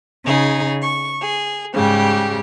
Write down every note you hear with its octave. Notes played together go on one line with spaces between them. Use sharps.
C#3 D#4 G#4
C#6
G#4
G#2 C#3 G3 G4